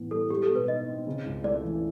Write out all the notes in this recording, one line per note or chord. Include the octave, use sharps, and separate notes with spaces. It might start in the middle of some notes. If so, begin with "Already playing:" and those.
Already playing: A2 E3 B3
G3 A4
G#3 G4
A4
B2
B4
D#4 D#5
C4
C#3
C#2
A3 D5
E3